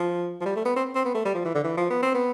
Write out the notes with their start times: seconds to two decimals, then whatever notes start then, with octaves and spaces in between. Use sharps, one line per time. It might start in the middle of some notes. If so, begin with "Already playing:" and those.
Already playing: F3
0.41 F3
0.45 G3
0.56 A3
0.65 B3
0.76 C4
0.95 C4
1.05 B3
1.15 A3
1.25 G3
1.35 F3
1.45 E3
1.55 D3
1.64 E3
1.77 F3
1.90 B3
2.03 C4
2.14 B3